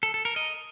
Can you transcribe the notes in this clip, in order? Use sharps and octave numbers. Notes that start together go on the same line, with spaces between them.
A4
A4
A#4
D#5